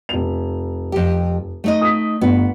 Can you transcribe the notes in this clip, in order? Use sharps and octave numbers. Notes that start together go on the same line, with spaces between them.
F1 F7
F2 G4
A3 D#4 D#5
D#6 B6
G1 B3